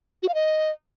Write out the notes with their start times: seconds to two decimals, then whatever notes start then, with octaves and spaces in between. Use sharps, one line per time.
0.23 F#4
0.28 F5
0.34 D#5